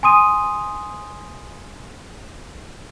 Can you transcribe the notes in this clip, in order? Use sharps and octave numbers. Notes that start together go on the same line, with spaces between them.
G#5 C6 D#6 D#7